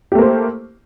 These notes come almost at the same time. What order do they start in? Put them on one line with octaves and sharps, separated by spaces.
G4 A3 A#3 C5